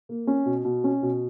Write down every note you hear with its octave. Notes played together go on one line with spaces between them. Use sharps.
A#3
C#4
B2
B2
C#4
B2